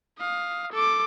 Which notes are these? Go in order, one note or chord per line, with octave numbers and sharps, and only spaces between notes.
F5 D#6
A4 D6